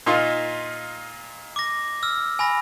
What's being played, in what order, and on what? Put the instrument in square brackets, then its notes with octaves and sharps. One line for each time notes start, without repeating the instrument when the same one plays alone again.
[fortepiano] A#2 D#4 F4
[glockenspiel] D6 A#6
E6 F6
G#5 B5 A#6